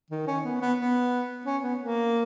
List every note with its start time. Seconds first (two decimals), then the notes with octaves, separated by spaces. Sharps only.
0.10 D#3
0.27 C#4
0.44 B3
0.61 B3
0.78 B3
1.45 C#4
1.63 B3
1.80 A#3